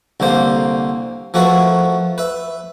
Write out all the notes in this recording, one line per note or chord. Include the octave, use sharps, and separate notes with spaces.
C2 D3 A#3 C5
F3 A3 F#4 A#4 B4
B4 E5